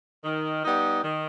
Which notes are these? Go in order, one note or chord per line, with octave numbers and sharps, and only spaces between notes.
D#3
G3 B3 D#4
D#3